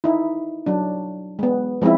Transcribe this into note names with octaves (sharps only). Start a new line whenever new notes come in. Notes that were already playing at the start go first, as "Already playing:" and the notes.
D#4 E4
F#3 D4
G#3 B3
F3 G#3 C4 C#4 E4